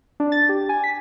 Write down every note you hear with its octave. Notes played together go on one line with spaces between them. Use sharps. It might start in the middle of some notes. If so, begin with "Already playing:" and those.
D4
A6
G4
G#5
B6